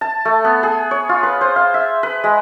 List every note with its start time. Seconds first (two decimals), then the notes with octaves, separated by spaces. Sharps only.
0.01 A5
0.25 A3
0.44 B3
0.63 G#4
0.91 C#5
1.09 F4
1.23 B4
1.41 C5
1.56 F5
1.74 E5
2.03 B4
2.24 G#3